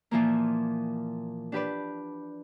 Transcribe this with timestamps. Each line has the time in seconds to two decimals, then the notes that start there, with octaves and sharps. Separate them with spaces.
0.11 A#2 E3 F3 A#3
1.52 D4 G4 B4 D5